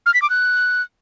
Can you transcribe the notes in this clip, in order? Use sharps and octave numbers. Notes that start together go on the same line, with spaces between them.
F6
B6
D6
F#6